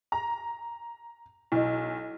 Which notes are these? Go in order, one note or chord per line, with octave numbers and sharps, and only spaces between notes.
A#5
B1 E4 D#5